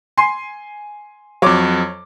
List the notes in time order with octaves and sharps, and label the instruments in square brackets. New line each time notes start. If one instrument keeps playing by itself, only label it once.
[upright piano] G#5 C6 C7
[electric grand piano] F2 F#3 [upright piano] C#5 D6